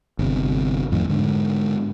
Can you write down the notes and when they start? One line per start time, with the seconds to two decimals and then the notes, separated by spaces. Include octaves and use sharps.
0.19 G1 C3
0.92 F2 A2 D#3
1.09 G#2 D3